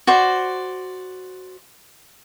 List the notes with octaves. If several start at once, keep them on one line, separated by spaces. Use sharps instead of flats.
F#4 C5 D5